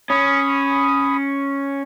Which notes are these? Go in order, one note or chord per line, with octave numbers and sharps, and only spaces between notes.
C#4 B5 D#6